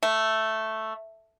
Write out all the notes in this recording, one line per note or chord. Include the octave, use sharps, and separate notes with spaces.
A3